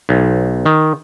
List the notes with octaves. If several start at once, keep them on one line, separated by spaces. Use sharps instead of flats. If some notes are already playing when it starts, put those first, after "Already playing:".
B1
D#3